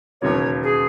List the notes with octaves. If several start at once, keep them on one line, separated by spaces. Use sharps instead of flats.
E1 D#2 C#3 F#3 A#3 C#5
G#4